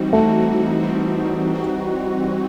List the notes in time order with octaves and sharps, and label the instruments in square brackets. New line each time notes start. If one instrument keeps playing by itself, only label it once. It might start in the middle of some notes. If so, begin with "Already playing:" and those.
Already playing: [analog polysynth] E3 G3 C4 D#4 F#4
[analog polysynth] E3 G3 C4 D#4 F#4 [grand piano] A3
[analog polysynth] E3 G3 C4 D#4 F#4
E3 G3 C4 D#4 F#4